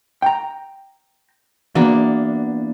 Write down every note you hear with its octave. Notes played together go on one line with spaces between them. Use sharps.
G5 A#5
E2 E3 A#3 B3 D4 F#4